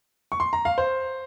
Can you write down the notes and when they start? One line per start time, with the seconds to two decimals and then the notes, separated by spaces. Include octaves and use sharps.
0.32 C#6
0.40 C6
0.53 A#5
0.65 F5
0.78 C5